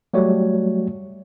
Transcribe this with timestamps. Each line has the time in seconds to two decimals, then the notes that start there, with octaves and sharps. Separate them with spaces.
0.14 F#3 G3 A3 F#4 C#5